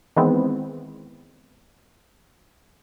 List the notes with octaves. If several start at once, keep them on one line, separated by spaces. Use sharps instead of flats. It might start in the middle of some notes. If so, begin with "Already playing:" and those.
D#3 E3 G#3 B3 C4